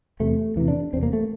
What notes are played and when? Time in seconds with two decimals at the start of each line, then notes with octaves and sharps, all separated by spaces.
0.20 E2 C3 A3
0.56 E2 C3 E3
0.68 D4
0.93 E2 C3 C4
1.03 A#3
1.13 A3